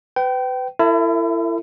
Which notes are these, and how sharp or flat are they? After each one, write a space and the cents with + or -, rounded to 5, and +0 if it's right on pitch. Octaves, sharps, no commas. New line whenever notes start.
B4 +30 G5 -25
E4 +30 A4 +45 E5 -5